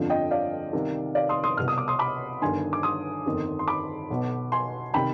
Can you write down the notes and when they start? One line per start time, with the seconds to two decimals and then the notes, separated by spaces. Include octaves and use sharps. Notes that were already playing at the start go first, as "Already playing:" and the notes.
Already playing: G1 F2 D3 F3
0.10 D#5 G5
0.31 D5 F5
0.73 C2 C3 D#3
1.15 D5 F5
1.29 C6 D#6
1.44 C6 D#6
1.57 C2 B2 F6
1.68 D#6
1.78 D6
1.88 C6 D#6
1.99 B5 D6
2.42 G1 G2 D#3 G#5 C6
2.73 D6
2.83 C6 D#6
3.26 G1 F2 D#3
3.59 C6
3.68 B5 D6
4.10 B1 B2
4.52 G#5 C6
4.94 C3 D#3 G5 B5